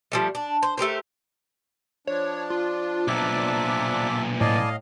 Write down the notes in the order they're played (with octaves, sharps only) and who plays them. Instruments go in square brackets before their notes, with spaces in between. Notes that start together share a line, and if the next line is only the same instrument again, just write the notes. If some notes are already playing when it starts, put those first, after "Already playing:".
[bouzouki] F3 G3 A3
D4
C5
A3 G4 A#4 C5
[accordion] F3 D4 [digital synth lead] C#5
[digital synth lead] F4
[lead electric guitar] B1 A#2 [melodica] E5 A5 [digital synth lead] D6
[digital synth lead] A2 [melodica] D5 G#5 A5 [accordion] D#5 F5